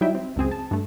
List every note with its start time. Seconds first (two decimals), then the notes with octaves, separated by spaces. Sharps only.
0.01 F#3 G3 D#4 E4 E5 G5
0.15 C4
0.36 C#2 F#2 C4 G#4
0.51 A5
0.71 G2 A3